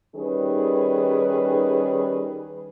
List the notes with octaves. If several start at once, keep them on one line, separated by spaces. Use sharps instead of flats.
D#3 G3 C#4 G#4 B4